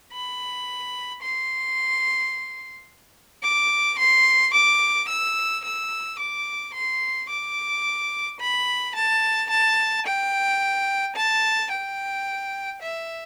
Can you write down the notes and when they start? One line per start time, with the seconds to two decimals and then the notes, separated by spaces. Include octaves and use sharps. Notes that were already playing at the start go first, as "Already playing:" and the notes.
0.13 B5
1.22 C6
3.43 D6
3.99 C6
4.53 D6
5.09 E6
5.64 E6
6.19 D6
6.74 C6
7.29 D6
8.40 B5
8.95 A5
9.50 A5
10.06 G5
11.16 A5
11.71 G5
12.82 E5